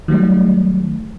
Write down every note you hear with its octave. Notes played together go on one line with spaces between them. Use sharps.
D#3 F#3 G3 A3